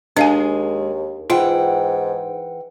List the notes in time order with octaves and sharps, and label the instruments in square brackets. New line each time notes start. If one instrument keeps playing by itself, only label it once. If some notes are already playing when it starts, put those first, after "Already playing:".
[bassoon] D#2 [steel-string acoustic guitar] G#3 [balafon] D4 F5 G#5
[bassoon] G#2 [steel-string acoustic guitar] E3 F#5 G5 [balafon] F4